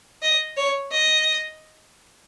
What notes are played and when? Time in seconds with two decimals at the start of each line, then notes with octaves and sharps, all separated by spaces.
0.22 D#5
0.57 C#5
0.92 D#5